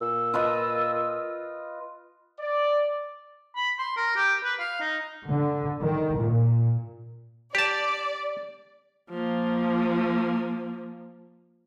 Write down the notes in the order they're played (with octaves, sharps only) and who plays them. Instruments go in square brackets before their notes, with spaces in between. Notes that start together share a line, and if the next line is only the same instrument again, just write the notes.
[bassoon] A#2 [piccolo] E6
[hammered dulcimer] F4 B4 D#5
[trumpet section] D5
[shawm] B5
C6
A#4
G4
B4
F5
D#4
[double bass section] D3
D#3
A#2
[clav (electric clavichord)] G4 A5 [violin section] D5
[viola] F3 A#3